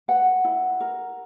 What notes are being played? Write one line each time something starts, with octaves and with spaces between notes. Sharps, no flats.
B4 F#5
E4
A#4